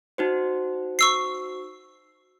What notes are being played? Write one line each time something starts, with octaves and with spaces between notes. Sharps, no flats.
D#4 F#4 C5
C#6 E6 C7